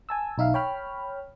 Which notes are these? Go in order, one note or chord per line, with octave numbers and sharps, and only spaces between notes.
G#5 A5 E6
B1 D#4 E5 F5
C#5 G5 B5 F6